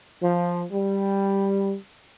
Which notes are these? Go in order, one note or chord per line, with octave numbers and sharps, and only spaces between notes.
F3
G3